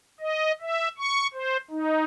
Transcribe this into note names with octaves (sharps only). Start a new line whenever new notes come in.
D#5
E5
C#6
C5
D#4